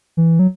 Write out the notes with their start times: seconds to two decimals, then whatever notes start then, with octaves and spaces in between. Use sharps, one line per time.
0.17 E3
0.39 F#3